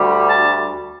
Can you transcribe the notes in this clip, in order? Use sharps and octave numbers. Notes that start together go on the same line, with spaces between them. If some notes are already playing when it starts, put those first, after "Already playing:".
Already playing: D2 D3 G3
A5